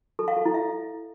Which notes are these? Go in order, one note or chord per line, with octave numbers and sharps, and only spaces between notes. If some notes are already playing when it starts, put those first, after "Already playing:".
A4
F5
A4
E4
E5